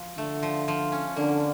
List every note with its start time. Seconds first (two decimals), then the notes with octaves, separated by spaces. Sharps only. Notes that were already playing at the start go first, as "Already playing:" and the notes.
Already playing: F3
0.18 D3 A3
0.43 F3
0.68 F3
0.92 C#4
1.16 D3 A#3